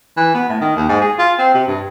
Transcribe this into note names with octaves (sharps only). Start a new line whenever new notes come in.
E3
B3
A2
D#3
D#2
G#2
G#4
F4
C4
C3
G2